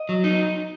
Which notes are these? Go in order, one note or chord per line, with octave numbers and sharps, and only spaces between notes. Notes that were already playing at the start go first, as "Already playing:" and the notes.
Already playing: D#5
F#3
D#4